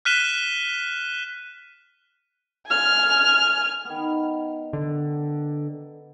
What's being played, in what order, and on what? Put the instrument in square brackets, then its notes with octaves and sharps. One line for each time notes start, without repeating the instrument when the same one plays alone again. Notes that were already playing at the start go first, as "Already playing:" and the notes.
[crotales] F6 F#6 B6 D#7 E7 G7
[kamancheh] G#5 F6
[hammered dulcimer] D#3 B3
[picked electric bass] D3